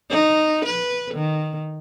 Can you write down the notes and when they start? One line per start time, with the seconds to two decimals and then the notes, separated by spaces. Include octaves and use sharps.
0.10 D#4
0.65 B4
1.15 D#3